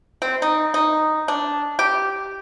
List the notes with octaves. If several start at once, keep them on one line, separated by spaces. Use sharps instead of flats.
C4
D#4
D#4
D4
G4